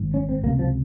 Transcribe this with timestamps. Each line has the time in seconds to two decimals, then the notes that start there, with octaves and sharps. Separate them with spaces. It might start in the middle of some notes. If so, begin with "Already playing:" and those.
Already playing: G#1 G#2
0.14 C#4
0.29 C4
0.43 C#2 C3 A#3
0.59 F3